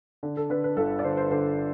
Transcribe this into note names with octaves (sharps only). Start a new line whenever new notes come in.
D3
A4
D3 B4
B4
G1 A4
D5
D3 C5
C5
D3 C5